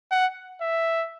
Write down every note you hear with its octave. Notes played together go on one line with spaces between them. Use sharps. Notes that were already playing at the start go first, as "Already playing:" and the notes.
F#5
E5